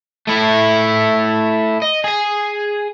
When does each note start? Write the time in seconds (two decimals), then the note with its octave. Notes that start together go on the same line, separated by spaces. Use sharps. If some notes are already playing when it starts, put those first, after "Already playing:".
0.28 A3 E4
1.82 D#5
2.04 G#4 G#5